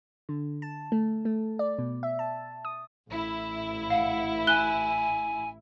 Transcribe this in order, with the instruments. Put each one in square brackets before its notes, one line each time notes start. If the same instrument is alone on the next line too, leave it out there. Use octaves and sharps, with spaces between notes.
[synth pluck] D3
A5
A3
A3
D5
B2
E5
A5
D#6
[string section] A1 E4
[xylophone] F5 [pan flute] F#5
[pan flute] G#5 [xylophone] F#6 G7